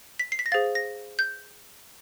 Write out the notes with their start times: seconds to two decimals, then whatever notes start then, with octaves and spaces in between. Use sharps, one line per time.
0.19 B6
0.32 C7
0.39 B6
0.46 A#6
0.52 G#4 C5 F5 A6
0.75 A#6
1.19 G6